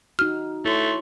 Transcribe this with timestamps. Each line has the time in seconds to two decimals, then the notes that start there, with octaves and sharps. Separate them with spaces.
0.19 D#4 F#4 F6
0.65 A3 E4 C#5 C6